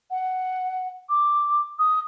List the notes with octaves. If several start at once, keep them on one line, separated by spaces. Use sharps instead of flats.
F#5
D6
D#6